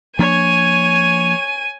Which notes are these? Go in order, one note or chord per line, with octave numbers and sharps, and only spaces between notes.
F3 A#3 D4 C#5 G#5 D#7